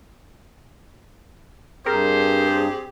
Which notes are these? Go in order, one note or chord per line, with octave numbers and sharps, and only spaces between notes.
G2 C4 G4 G#4 A#4 C5